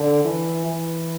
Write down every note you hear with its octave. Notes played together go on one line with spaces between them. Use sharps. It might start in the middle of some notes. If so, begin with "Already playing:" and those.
Already playing: D3
E3
E3